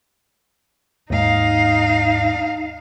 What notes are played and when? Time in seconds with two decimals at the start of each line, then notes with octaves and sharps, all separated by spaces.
1.10 D#2 G#2 D#4 F5